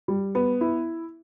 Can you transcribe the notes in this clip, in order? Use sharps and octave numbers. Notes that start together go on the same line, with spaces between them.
G3
B3
E4